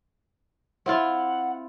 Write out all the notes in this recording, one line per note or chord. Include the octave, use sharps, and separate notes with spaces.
C4 E4 F4 F#5